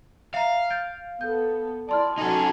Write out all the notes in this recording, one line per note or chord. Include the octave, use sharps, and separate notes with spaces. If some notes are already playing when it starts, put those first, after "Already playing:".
E5 F5 A#5
G6 A6 D7
B3 A4 G6
E4 D5 A5 C6 F6
C#4 D#4 F#4 A4 G#5